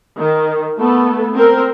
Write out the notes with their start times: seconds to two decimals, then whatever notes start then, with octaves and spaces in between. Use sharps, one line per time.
0.18 D#3
0.78 A3 B3 A4
1.35 C4 A#4